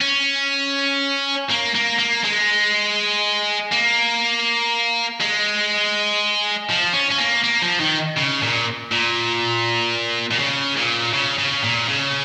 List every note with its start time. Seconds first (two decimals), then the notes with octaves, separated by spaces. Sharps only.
0.01 C#4
1.50 A#3
1.75 A#3
1.99 A#3
2.24 G#3
3.72 A#3
5.20 G#3
6.69 F3
6.93 C#4
7.10 C#4
7.18 A#3
7.44 A#3
7.62 F3
7.80 D#3
8.17 C#3
8.42 A#2
8.92 A#2
10.31 A#2
10.39 C#3
10.77 A#2
11.13 C#3
11.38 C#3
11.63 A#2
11.89 C#3